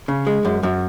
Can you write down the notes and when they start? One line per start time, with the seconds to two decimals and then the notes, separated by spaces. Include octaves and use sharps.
0.08 C#3
0.27 G#3
0.45 F#2
0.63 F#2